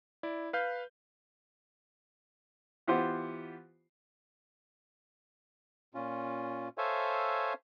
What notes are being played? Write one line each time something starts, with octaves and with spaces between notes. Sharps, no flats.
E4 D5
B4 F5 G6
E3 B3 F4 G4 C5
A#2 C#4 F4
A4 C5 C#5 E5 F5 G#5